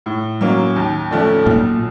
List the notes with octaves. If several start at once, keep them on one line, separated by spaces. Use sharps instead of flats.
A2
F#3 A#3 C#4
D#2
D3 F3 A3 C#4
B1 A#2